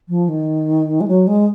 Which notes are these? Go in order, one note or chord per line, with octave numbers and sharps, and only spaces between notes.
F3
D#3
G#3
F#3
G#3